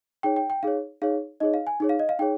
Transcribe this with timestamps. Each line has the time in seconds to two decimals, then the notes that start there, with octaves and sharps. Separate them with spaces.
0.23 D#4 G#4 C#5 G5
0.36 G5
0.50 G5
0.63 D#4 G#4 C#5 F5
1.02 D#4 G#4 C#5 F5
1.40 D#4 G#4 C#5 D#5
1.54 F5
1.67 G#5
1.80 D#4 G#4 C#5
1.89 F5
1.99 D#5
2.09 F5
2.19 D#4 G#4 C#5 G5